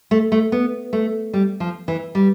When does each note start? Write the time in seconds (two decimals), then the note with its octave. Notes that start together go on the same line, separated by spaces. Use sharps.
0.11 A3
0.32 A3
0.52 B3
0.93 A3
1.33 G3
1.60 F3
1.88 E3
2.15 G3